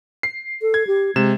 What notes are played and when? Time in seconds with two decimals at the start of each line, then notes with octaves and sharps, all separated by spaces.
0.23 C7
0.62 A4
0.74 G#6
0.87 G4
1.16 C3 G#3 E7